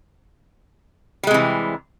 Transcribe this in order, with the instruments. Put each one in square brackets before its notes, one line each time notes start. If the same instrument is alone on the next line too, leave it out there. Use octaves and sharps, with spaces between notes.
[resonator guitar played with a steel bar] G3
G#3
C3
E3